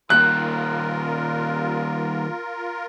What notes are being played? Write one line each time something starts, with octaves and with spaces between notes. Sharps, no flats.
D#2 A#2 F4 A#4 F#6